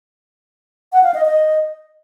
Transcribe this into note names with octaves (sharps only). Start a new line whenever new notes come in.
F#5
F5
D#5
D#5